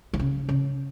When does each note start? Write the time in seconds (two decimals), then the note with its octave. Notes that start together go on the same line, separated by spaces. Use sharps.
0.13 E3
0.19 C#3
0.49 C#3